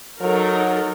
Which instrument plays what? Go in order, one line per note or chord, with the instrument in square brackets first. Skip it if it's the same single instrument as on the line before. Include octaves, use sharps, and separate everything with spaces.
[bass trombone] F#3 [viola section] D#4 A4 A#4